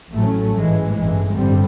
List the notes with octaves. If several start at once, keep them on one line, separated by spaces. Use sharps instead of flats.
A1 A2 F#3 A3 C#4
G#2 E3 G#3
A1 G2 E3 G#3
A1 G2 D3 G3 C4